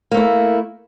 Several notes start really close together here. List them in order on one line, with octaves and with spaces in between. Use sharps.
A#3 A3 E4